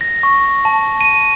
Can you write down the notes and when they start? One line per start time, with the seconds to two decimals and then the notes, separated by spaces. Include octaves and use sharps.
0.01 A#6
0.23 C#6
0.65 A5
1.01 D#7